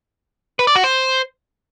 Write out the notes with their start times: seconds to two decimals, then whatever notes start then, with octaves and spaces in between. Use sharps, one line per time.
0.59 B4
0.67 D5
0.76 F#4
0.84 C5